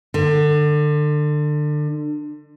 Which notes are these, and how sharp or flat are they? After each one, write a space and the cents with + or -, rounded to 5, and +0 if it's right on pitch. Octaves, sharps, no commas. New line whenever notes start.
D3 +30